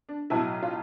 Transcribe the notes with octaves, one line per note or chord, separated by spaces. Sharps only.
D4
B1 A2 F#3 E4
F4